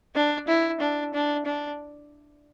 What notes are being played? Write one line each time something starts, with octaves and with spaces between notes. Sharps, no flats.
D4
E4
D4
D4
D4